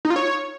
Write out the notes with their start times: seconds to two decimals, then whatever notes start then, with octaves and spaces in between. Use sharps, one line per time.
0.05 D#4
0.10 F4
0.16 C#5